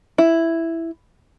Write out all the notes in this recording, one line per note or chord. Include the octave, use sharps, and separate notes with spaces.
E4